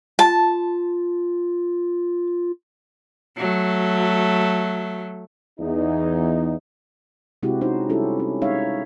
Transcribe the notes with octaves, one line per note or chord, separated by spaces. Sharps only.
F4 A5
F#3 A3
E2 D#4
C3 G#3 C4 E4 F#4 G4
C#4 D#4 F#4 C5
G3 C4 C#4 E4 G4 A4
C#4
G#3 C#4 D#4 C#5 E5 F5